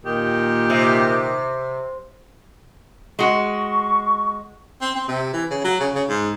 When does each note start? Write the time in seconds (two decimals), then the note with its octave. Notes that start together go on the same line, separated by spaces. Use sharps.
0.05 A#2 D#3 G4
0.70 C3
3.19 G#3 F#4 C#6
4.81 C4
4.96 C4
5.08 C3
5.34 E3
5.51 C#3
5.64 F#3
5.80 C#3
5.95 C#3
6.09 G#2